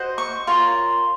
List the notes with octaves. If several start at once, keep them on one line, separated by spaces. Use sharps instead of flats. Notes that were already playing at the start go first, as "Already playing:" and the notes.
Already playing: F#4 C5 D#5
C#6
F4 A#4 C#5 C6